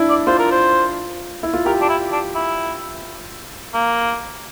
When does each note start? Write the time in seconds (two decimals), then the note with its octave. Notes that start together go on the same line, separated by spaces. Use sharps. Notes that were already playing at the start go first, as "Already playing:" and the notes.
Already playing: D4 E4
0.10 D5
0.27 F4 C5
0.39 A#4
0.51 C5
1.43 E4
1.54 F4
1.65 G4 A#4
1.81 D4
1.89 E4
2.12 D4
2.35 E4
3.74 A#3